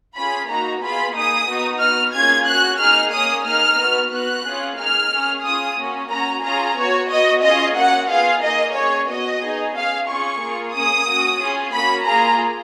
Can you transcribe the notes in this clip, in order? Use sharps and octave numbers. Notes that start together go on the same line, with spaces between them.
C#4 F4 G#4 B5
A#3 D#4 F#4 A#5
B3 F4 G#4 B5
A#3 D#4 G#4 D#6
B3 D#4 F#4
B3 F#4 F6
A#3 C#4 F4 G#4 G#6
C#4 F#4 F#6
A#3 D#4 G#4 F6
A#3 C#4 G#4 D#6
A#3 D#4 G#4 F6
B3 F#4
B3 F#4 F#6
C#4 F4 G#4
A#3 D#4 G#4 F6
C#4 G#4
C#4 F4 G#4 D#6
A#3 C#4 F#4
C#4 F#4 A#5
C#4 F4 G#4 A#5
B3 F#4 C#5
B3 F#4 D#5
C#4 F4 G#4 D#5
A#3 C#4 F#4 F#5
B3 F4 G#4 F5
A#3 D#4 G#4 D#5
C#4 G#4 C#5
B3 F#4 D#5
B3 D#4 G#4
C#4 G#4 F5
C#4 F4 G#4 C#6
A#3 F4 G#4
A#3 C#4 G#4 D#6
C#4 F#4
C#4 F4 G#4
A#3 C#4 F#4 B5
A#3 F4 G#4 A#5